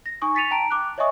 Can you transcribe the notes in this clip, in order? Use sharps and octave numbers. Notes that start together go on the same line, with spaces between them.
A#6
D#4 G#5 C#6 D#6
A6 B6 C#7 D#7 F7
G5 A5 A#5 D7
D6 F#6
C#5 D#5 E5 G#5 C#6 D#6